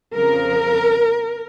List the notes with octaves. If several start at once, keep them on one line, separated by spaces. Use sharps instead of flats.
F2 C#3 F3 A#4